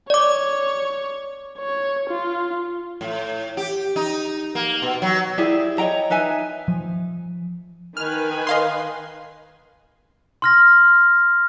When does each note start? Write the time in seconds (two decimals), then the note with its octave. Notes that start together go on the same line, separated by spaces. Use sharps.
0.10 C#5 D5 D6
1.58 C#5
2.10 F4
3.01 A2
3.57 G4
3.96 D#4
4.55 A#3
4.82 B2
5.02 F#3
5.38 E4 G4 G#4 D5
5.78 C#5 D#5 G5 A#5
6.10 D#4 B4 E5 G#5
6.68 F3
7.97 D#3 B4 G#5 F6
8.47 D#5 F5 C6
10.42 C6 F6 A#6